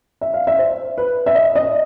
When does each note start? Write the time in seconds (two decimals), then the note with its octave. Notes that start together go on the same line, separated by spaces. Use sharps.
0.21 E5
0.34 F5
0.47 E5
0.59 C5
0.98 B4
1.26 E5
1.35 D#5
1.55 D#5